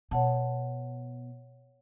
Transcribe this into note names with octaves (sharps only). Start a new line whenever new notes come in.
B2 C#5 F#5 A5